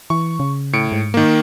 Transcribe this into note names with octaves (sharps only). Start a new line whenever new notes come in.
E3 C#6
C#3
A2 C#7 D7
G#2
D#3 A#3